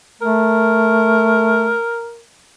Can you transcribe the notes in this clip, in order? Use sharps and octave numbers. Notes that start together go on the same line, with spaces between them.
A3 A#4